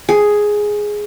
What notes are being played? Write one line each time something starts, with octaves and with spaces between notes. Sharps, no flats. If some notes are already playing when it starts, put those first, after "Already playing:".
G#4